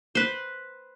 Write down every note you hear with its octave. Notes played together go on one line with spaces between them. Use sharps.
B4 C5